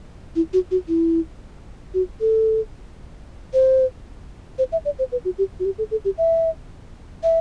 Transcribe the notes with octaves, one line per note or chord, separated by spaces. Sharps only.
E4
F#4
F#4
E4
F#4
A4
C5
C5
E5
D5
C5
B4
F#4
G4
F#4
G4
A4
A4
G4
E5
E5